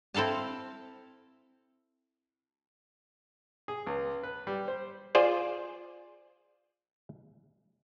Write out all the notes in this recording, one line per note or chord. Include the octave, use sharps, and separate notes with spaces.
C4 E4 A4 F5 A5
G#4
C#2
B4
G3
C5
F4 G#4 C5 D5